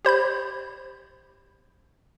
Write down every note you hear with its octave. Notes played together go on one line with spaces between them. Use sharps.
G4 C5 B5 G6